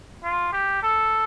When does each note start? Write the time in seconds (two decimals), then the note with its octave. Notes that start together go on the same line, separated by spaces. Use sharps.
0.24 F4
0.53 G4
0.83 A4